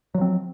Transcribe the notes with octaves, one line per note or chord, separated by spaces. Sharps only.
F3 F#3 C4